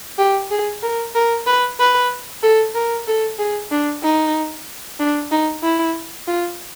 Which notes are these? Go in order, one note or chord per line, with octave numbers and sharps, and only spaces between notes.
G4
G#4
A#4
A#4
B4
B4
A4
A#4
A4
G#4
D4
D#4
D4
D#4
E4
F4